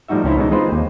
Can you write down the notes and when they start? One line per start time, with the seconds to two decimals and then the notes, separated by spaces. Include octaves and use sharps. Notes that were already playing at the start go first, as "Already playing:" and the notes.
0.08 A2 F3 G3 D#4 F#4 E5
0.24 C#2 C#4 D#4 E4 C5
0.38 B2 E3 G#3 D#4
0.51 G#3 C4 D#4 F4 B4 C5
0.71 D#2